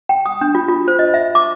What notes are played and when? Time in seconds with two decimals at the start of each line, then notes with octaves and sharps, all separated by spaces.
0.09 G5
0.26 D#6
0.41 D4
0.55 F4
0.69 F4
0.88 C5
0.99 D#5
1.14 E5
1.35 D6